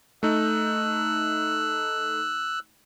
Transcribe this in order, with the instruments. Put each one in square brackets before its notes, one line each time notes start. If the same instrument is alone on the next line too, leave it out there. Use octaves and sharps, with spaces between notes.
[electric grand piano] A3 D#4 [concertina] E6 F#6